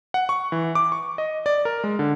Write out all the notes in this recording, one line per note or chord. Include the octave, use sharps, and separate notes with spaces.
F#5
C#6
E3
D6
C#6
D#5
D5
A#4
G#3
D3